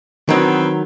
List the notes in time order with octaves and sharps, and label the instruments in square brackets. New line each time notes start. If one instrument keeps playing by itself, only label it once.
[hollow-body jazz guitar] D#3 F#3 [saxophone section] E3 B3 C4